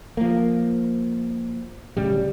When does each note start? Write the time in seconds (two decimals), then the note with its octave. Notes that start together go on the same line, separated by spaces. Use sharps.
0.17 F3 A#3
1.97 D1 C#3 G3